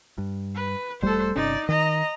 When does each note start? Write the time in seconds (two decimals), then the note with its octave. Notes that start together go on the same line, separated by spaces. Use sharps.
0.18 G2
0.55 B4
1.02 E1 G3 A3 A4 C5
1.35 G1 C3 C#4 D#4 D5
1.69 D#3 D#5 A#5